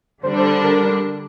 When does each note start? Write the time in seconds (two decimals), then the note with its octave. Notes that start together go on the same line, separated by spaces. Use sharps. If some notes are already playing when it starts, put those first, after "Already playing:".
0.23 D3 G3 D4 C5
0.36 C5
0.64 A#4